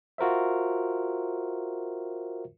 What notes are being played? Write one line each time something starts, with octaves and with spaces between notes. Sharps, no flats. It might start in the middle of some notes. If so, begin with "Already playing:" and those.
F4 F#4 A#4 C5 E5